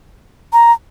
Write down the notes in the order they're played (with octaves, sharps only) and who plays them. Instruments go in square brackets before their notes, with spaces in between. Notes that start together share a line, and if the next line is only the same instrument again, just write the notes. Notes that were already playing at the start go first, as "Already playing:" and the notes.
[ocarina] A#5